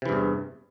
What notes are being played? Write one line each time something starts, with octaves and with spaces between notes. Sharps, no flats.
E2 G2 C3 E3